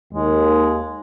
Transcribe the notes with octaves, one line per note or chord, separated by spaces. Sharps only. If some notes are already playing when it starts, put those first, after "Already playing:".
D#2 G#3